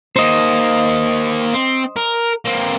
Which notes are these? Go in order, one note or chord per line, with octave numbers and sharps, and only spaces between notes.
A#3 D#4 C5 D#5
C4
A#4
A#3 C4